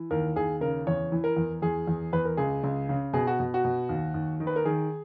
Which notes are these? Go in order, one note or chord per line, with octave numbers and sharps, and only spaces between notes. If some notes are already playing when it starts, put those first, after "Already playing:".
Already playing: E3
D#2 A#4
D#2 G#4
C#3 A#4
E2 C#5
E3
A#4
E2
E2 G#4
E2
E2 B4
A#4
C#2 G#4
C#2
C#3
B2 G#4
F#4
B2
F#4
B2
D#2
D#2
D#3
B4
A#4
D#3 G#4